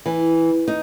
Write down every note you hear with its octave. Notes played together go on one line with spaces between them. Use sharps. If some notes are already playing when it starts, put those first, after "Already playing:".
E3
D#4